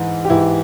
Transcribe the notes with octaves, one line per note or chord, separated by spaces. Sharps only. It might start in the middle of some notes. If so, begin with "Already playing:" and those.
Already playing: G#2 E3
G4
G#2 E3 E4